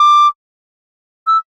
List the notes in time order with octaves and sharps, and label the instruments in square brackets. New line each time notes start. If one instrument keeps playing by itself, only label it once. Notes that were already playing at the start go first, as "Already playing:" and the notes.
Already playing: [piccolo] D6
E6